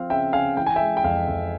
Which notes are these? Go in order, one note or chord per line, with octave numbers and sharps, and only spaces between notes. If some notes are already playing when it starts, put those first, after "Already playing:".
Already playing: F3 C4 F5
C#3 E5 G5
C#3 F5 G#5
E3 G5
G#5
E5 G5
G#3
G5
F2 F5
F2